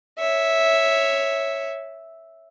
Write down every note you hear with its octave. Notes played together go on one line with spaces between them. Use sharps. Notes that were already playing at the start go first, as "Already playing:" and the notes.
C#5 E5